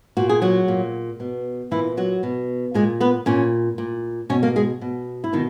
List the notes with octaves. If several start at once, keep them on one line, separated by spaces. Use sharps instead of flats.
A#2 F#4
G#4
F#3 F#4
A#2
B2
A#2 E3 E4
F#3 F#4
B2
A#2 G#3 G#4
B3 B4
A#2 C#4 C#5
A#2
B2 C#4 C#5
A#3 A#4
G#3 G#4
B2
E4
B2 D#3 D#4